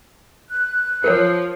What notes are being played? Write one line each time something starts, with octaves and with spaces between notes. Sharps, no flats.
F#6
F3 A#4 C#5